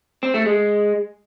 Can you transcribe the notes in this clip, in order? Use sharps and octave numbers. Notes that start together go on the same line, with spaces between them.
C4
A3
G#3